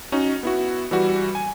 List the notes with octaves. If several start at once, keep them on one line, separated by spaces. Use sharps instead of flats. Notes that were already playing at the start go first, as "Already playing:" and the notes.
C#4 D#4 F#4
B3 E4 F#4
E3 G3 F#4
G#5